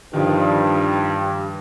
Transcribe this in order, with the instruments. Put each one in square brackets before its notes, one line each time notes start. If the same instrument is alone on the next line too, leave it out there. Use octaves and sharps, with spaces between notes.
[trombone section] G2 [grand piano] D#3 F3